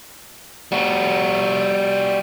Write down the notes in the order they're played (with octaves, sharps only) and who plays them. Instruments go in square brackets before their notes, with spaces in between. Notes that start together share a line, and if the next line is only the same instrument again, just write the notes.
[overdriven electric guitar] G3 F#4